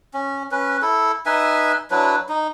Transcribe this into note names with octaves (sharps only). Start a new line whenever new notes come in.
C#4
C#4 B4
E4 A4
D#4 B4 E5 G#5
F#3 D4 E4 B4
D#4